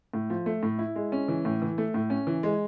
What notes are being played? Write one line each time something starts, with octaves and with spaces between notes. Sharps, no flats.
A2
F3
A3
A2
E4
G#3
C#4
E3
A2
E3
A3
A2
C#4
E3
G#3